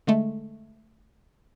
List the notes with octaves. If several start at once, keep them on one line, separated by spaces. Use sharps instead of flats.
D3 G#3 A3